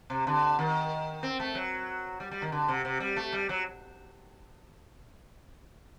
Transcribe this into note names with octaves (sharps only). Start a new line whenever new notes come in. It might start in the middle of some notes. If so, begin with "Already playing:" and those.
C3
D3
D#3
C4
A3
F#3
G3
G3
D#3
D3
C3
C3
G3
A3
G3
F#3